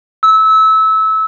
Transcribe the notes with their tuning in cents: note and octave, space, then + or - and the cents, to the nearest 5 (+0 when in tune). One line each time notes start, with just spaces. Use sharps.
E6 -25